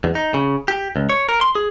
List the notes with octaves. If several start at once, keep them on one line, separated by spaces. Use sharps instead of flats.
E2
D#4
C#3
G4
C#2
C#5
A#4
C6
G#4